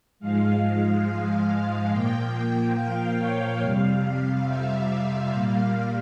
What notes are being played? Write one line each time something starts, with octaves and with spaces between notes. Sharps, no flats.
G#2 F3 G#3 F5
F5
A#2 F3 A#3 G5
F5
C#5
F2 C3 G3 F5
E5
A#2 G3 A#3 F5